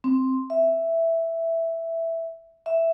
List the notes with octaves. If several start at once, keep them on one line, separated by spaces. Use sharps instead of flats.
C4
E5
E5